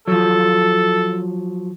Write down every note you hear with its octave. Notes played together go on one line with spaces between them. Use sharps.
F3 F#3 A4